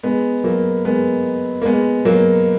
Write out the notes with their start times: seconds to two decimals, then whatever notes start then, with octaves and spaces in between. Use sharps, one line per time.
0.03 G#3 B3
0.44 F#3 A#3
0.85 G#3 B3
1.62 A#3
1.65 G#3 B3
2.05 F#3 A#3